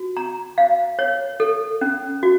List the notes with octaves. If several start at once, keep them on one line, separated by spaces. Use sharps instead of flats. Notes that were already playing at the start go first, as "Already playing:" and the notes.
Already playing: F#4
A#5
F5
C#5
A4
C#4
F#4